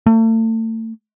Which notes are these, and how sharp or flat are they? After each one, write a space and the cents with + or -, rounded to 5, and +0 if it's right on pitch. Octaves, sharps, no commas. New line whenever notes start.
A3 +35